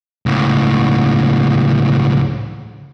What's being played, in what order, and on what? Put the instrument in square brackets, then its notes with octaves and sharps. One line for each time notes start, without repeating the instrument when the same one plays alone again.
[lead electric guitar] C#2 A2